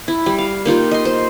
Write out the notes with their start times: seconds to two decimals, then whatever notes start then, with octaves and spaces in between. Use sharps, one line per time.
0.08 E4
0.26 G3
0.38 F5
0.65 A#3 D#4 F4 G4
0.91 D#5 C6
1.05 C5